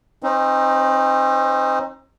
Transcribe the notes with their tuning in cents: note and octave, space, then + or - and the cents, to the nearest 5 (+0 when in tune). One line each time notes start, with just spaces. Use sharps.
C4 +45 D#4 +0 C5 -30